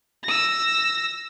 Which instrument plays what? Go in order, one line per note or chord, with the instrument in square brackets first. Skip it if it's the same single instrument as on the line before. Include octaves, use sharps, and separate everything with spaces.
[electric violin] E6 A#6